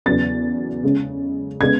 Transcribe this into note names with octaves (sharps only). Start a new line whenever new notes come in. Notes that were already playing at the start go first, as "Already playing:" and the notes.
E2 C#3 F#3 B3 A6
C#3 G#3 C#4
C#3 G#3 B3 G#6